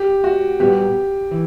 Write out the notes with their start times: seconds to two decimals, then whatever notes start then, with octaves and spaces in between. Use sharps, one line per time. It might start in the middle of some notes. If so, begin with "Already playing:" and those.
Already playing: G4
0.24 F#4
0.60 A#2 G3 B3 F#4 G4
1.31 E3